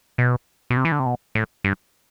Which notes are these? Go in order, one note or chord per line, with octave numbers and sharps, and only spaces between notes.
B2
B2
C3
E3
D3
C3
B2
A2
G2